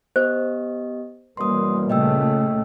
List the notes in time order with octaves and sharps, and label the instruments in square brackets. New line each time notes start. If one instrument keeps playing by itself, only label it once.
[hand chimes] B3 G4 D#5 [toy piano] C5
[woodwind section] F#2 B2 G3 [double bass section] E3 A#3 [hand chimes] C6 D#6
[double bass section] A#2 C#3 A3 [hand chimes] D#5 G5 E6